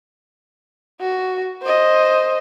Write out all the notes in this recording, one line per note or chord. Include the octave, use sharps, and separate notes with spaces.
F#4
C5 D#5